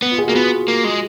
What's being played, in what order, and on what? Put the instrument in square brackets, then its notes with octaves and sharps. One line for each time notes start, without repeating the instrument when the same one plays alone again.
[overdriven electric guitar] B3
[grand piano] F4
G#4
[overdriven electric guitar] A#3 [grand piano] F#4
[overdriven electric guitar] B3 [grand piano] F4
[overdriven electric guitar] A#3
G#3